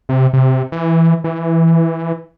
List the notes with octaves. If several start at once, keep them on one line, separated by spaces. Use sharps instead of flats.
C3
C3
E3
E3